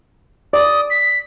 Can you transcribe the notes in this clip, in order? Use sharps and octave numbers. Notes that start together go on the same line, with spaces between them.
D5 D#6
B6